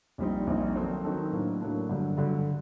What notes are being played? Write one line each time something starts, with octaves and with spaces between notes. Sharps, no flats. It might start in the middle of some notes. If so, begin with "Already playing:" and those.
A#1 A#2 G3 C4 D#4
A#1 A#2 G3 C4 D#4
D#3 F#3 C4 D#4 A4
D#3 F#3 C4 D#4 A4
A2 F#3 A#3 D4
A2 F#3 A#3 D4
G2 D3 F#3
G2 D3 F#3